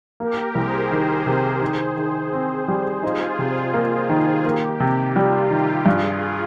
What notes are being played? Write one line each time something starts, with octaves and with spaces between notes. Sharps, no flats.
A#3 G4 A#4
C2 G#4 C5
D#3 G#4 C5
C3
D#3
D#3
C4
G3
D#4 F4 G#4
C3
A#3 F4
D#3 F4 G#4
A#3 G4
C3
G3 F4
D#3 G4
G2 F4 G#4